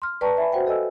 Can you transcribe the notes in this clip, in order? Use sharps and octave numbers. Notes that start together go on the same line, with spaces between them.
C6 F6
B4 D5 G5 A5 A#5 C#6
E5 G#5 B5
F#4 C5 F#5 G5
A4 D#5 G#5 E6